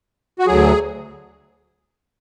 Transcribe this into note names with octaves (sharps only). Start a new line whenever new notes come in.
F#4
D2 D3 F#3 G#4